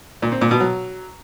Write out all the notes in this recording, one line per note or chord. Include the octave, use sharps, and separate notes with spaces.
A#2
C4
A#2
B2
F#3